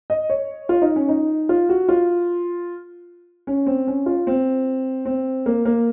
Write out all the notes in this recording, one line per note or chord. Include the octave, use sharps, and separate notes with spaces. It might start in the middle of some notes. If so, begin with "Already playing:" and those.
D#5
C#5
F4
D#4
C#4
D#4
F4
F#4
F4
C#4
C4
C#4
F4
C4
C4
A#3
A#3